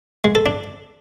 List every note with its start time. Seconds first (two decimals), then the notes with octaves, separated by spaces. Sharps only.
0.24 G#3
0.35 A4
0.46 D4